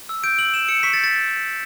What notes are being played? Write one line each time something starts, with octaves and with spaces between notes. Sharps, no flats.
E6
G6 D7
E6 F#7
E6 E7
E6 C#7
C#6 B6
A6
G6
A6